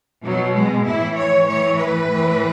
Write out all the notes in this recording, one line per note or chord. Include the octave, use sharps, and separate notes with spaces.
B2 F#3
G#3
A2 E3 E4
C#5
A2 E3 C#5
B4
A2 E3